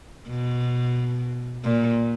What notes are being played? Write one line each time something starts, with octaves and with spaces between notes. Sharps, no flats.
B2
A#2